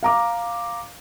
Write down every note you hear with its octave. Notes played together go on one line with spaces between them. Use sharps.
F5 A#5 D6